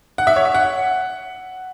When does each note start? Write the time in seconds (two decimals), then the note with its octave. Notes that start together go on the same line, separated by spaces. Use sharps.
0.18 F#5
0.27 E5
0.36 C#5
0.45 E5
0.54 F#5